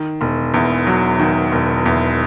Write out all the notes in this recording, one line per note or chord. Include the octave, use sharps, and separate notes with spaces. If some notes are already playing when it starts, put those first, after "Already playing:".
Already playing: D#3
E1
E2
F#3
D#3
E1
E2